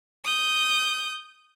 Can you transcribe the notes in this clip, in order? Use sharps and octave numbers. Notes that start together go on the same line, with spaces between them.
D#6 G6